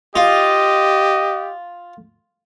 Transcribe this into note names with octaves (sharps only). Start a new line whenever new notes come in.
F4 G4 D#5